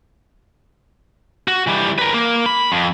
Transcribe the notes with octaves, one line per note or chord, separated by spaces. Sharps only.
F#4
E3 G3
A#4 B4
A#3
B5
F2